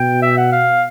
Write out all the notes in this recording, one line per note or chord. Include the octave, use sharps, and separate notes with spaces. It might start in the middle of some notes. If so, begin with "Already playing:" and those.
Already playing: B2 G5
E5
F#5
F5